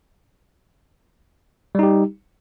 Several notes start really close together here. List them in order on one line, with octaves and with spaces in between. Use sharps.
G3 D#4 G4